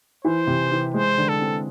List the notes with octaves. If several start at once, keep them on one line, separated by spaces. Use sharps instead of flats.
E3 C5
C3
E3
G#3 C5
D3
A4
C4